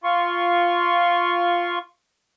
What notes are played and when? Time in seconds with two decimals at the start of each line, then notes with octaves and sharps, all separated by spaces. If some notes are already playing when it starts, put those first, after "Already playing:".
0.04 F4 C6 C#6